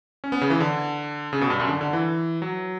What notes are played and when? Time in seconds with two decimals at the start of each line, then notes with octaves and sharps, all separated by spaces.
0.24 C#4
0.32 B3
0.41 C#3
0.50 E3
0.60 D3
1.33 C#3
1.41 B2
1.50 G2
1.60 F#2
1.69 D3
1.81 D3
1.93 E3
2.42 F#3